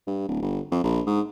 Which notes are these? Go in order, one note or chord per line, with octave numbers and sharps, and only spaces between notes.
G2
D1
G1
F2
A#1
G#2